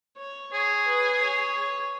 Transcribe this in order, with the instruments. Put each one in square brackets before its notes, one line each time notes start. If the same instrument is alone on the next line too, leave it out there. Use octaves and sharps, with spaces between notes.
[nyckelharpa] C#5
[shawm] G#4 [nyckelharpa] C#5
[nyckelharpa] B4
C#5